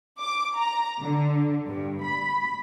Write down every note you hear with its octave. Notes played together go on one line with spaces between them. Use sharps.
D6
A#5
D3
G2
B5